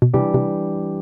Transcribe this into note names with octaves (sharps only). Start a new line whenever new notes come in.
B2
C3 E3 G3 D4 G4
C3